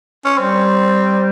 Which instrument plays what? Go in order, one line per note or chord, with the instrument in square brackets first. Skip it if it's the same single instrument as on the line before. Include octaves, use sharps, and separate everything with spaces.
[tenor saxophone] C#4
[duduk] G3 [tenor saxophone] C4